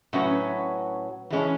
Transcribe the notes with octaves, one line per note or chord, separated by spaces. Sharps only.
A2 F#3 C#4 F#4 B4
E3 G#3 C#4